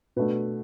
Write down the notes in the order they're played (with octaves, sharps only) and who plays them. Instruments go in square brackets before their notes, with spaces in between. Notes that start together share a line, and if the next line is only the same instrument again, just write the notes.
[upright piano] B2 A3 D4 B4